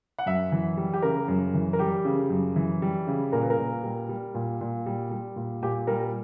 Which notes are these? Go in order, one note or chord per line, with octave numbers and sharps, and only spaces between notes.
F#5
F#2 E5
E3
G3
G4
C#3 A#4
F#2
E3
A#4
G3 G4
C#3
F#2
E3
G3
C#3
A#2 A#4
B4
A#4
A#2
G3
G3
A#2
A#2
G3
G3
A#2
A#2 G4
G3 A#4